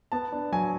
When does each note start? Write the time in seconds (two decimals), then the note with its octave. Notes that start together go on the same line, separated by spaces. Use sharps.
0.12 B3 A5
0.32 D4
0.52 F#3 G#5